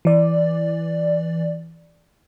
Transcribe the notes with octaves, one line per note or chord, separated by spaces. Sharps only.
E3 D5